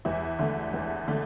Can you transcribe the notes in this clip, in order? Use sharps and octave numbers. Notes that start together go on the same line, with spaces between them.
E2 E4
D3 A3
E2
D3 A3